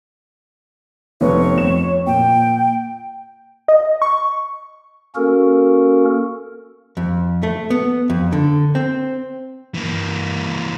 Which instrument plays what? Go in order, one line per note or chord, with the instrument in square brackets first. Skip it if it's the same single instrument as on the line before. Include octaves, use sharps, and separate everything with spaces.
[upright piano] F1 B3 [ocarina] C#5
[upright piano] F2 E7
[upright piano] A#2 [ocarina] G5
[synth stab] D#5
C#6
[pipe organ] A#3 C#4 F#4 A4 A#4
[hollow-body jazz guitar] F2
A3
B3
F2
D3
C4
[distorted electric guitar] E3 A#3